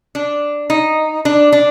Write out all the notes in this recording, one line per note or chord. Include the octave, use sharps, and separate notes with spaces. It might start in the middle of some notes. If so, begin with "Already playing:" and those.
D4
D#4
D4
D4